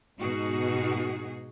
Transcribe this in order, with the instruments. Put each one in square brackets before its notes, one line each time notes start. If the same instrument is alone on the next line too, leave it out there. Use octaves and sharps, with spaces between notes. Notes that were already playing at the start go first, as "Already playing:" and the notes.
[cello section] G#2 B2 D#4 F#4 G#4